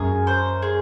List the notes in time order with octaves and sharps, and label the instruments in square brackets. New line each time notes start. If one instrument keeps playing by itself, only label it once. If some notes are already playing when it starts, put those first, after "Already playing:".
Already playing: [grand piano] F#2 [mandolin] G#4
[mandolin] C5
G#4